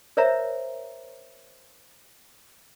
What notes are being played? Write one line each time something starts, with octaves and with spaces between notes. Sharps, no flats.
A#4 C5 C#5 E5 A#5